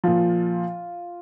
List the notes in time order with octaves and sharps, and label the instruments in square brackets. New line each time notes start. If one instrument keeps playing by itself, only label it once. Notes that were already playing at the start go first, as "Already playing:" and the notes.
[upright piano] A#2 F3 F4